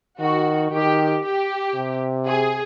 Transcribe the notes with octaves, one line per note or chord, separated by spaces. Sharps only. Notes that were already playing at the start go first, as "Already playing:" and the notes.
D#3 F#4
D#3 G4
G4
C3
G#4